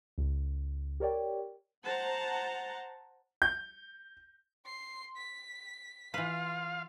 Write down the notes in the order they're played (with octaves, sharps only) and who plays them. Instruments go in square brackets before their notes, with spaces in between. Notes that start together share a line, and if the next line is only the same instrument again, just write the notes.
[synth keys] C#2
G4 A#4 C#5 D5 G5
[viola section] C5 F#5 A5 A#5
[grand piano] G6
[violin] C6 C7
B6
[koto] E3 B4 [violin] F4 [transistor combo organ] F5